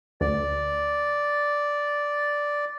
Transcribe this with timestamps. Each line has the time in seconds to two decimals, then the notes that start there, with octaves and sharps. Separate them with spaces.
0.21 D2 D5